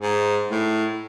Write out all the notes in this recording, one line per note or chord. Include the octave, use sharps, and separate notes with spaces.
G#2
A2